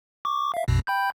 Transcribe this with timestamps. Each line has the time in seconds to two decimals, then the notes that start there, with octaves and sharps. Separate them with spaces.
0.25 C#6 D6
0.54 E5 F5
0.68 A#1 F2 B2
0.87 G5 B5 G6